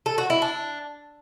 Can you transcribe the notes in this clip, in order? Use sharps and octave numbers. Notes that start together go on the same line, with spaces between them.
A4
F#4
E4
D4